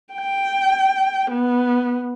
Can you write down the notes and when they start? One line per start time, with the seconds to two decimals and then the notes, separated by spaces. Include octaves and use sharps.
0.13 G5
1.30 B3